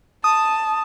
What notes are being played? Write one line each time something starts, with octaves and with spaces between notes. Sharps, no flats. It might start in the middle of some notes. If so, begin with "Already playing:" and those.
A5 D#6